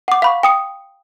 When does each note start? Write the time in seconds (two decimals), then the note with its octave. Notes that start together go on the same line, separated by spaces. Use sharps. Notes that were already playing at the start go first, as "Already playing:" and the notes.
0.08 F#5 D6
0.22 F5 B5 C#6
0.43 G5 D#6 C#7